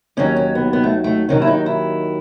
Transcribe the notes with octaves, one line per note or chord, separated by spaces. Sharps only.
D#2 D#3 F#3 C#4
C#4
B3
B3
A3
A3
D#2 D#3 F#3 C#4
E4
D#4
E4